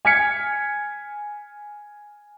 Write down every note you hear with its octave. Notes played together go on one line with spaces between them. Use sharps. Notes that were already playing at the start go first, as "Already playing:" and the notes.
G#5 F6 G#6 B6 C#7